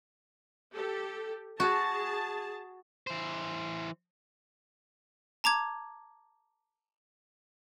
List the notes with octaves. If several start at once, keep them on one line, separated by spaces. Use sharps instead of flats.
G4 A4
F#4 G#4 A5
E3 C5
A5 A#5 D6 G#6